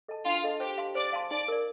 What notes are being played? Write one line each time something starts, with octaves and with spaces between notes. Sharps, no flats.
A4 D#5 A5
D4 F4
A4 D#5 A5
G4 C5
F5 A5 C6
C5 D5
F5 A5 C6
D#4 D5
A#4 D5